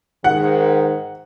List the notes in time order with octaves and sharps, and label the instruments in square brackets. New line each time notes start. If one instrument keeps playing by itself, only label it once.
[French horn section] G#2 D#3 [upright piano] F#5